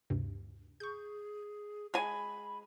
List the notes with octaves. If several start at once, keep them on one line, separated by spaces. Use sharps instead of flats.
D2 G2 C3
G#4 C#6 G6
G#3 G#5 B5